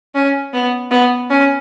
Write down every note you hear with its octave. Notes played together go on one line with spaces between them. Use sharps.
C#4
B3
B3
C#4